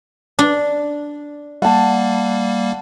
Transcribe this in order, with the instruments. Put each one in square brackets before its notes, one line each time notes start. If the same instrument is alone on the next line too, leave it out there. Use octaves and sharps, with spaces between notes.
[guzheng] D4
[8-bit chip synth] G3 A#3 [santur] F#5 A5